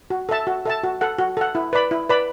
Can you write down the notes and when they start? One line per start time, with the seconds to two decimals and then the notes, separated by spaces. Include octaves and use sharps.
0.10 F#4
0.29 A4 E5 A5
0.47 F#4
0.65 A4 E5 A5
0.84 F#4
1.01 A4 F#5
1.19 F#4
1.37 A4 F#5
1.55 E4
1.73 B4 D5 B5
1.91 E4
2.09 B4 D5 B5